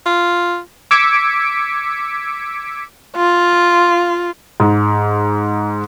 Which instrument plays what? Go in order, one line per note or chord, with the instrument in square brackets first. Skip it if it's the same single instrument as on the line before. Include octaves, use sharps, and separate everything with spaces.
[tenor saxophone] F4
[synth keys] D6 E6 G#6 B6 C#7 D7
[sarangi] F4
[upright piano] G#2